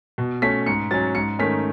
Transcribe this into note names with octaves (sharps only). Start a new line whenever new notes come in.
B2
A3 C#4 B6
G#2 C#7
F#3 C#4 A6
G#2 C#7
D#3 A3 C#4 B6